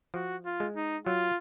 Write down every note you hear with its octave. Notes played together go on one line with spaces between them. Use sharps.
F3 F#4
F4
G#3
D#4
F#3 F4